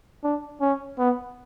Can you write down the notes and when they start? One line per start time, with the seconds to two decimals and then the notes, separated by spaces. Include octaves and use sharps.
0.24 D4
0.61 C#4
0.98 B3